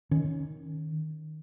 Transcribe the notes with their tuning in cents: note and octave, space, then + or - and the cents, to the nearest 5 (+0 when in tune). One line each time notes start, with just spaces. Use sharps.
D#3 +0 C#4 +0